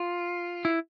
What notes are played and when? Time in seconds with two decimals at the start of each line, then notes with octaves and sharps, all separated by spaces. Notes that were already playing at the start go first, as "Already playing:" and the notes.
Already playing: F4
0.65 E4